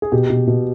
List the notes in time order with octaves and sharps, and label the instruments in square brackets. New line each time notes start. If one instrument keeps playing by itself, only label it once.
[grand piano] G#4
B2 G4
B2
B2